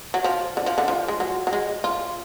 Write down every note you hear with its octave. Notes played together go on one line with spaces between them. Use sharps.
F#3
F3
D3
F3
D3
F3
G#3
F#3
F#3
G#3
F4